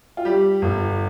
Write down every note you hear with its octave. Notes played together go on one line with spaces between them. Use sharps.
F4
G3 G4
G1